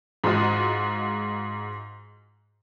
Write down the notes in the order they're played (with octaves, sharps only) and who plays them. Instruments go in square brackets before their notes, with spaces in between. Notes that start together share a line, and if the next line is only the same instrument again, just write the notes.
[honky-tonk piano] G#2 F4 F#4 D#5